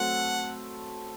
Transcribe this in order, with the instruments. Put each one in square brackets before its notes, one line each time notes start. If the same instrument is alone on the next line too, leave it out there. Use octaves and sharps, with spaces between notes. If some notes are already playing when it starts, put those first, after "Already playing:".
Already playing: [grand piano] F#3 A3 C4 [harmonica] F#5